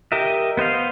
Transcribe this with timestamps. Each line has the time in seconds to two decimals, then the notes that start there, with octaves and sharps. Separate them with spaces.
0.12 G4 A#4 D#5 E5
0.57 B3 C5 D#5 F5